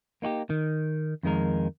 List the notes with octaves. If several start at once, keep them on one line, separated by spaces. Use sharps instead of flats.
A#3 D#4 F#4 G4
D#3
F2 D#3 G#3 A#4